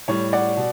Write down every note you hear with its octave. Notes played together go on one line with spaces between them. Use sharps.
A2 G3 C#5
D5 F#5
B2